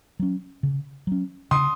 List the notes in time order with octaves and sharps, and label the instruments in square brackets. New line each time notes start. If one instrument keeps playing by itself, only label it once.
[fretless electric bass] F#3 C#4
C#3
F#3 C#4
[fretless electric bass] C#3 [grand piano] C6 D#6